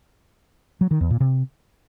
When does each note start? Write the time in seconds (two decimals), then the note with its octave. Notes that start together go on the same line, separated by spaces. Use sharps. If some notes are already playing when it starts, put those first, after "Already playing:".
0.81 F#3
0.91 D#3
1.01 E2
1.11 A#2
1.20 C3